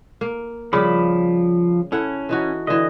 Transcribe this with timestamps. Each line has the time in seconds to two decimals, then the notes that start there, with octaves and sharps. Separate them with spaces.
0.21 A#3
0.73 C#3 F3 G3 G4 B5 D6
1.92 C#4 E4 A4 F#5
2.29 E3 D#4 F#4
2.67 D3 E3 D#5